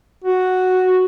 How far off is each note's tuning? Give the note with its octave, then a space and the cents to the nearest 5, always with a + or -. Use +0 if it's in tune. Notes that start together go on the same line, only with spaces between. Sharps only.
F#4 +0